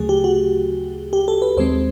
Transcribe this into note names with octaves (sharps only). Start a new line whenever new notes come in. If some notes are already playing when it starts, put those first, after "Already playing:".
Already playing: D2 C#3 F#3 A3 G#4
G4
F#4
G4
A4
B4
D#2 D#3 G#3 C4 C5